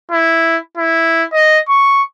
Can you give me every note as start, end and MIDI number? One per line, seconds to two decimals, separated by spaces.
0.12 0.58 64
0.77 1.25 64
1.33 1.59 75
1.69 2.02 85